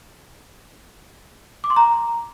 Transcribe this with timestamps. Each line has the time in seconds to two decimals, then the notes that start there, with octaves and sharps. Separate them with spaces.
1.64 D6
1.70 C6
1.76 A#5